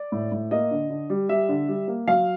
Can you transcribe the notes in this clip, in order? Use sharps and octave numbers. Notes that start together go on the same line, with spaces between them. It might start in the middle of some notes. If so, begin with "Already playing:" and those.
Already playing: D5
A2
A2
A#3 D#5
D3
D3
G3
G3 E5
D3
G3
A#3
F#3 F5